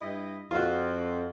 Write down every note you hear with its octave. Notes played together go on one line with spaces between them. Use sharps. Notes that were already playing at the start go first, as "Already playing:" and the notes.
G2 E4 D#5
F2 F4 F#4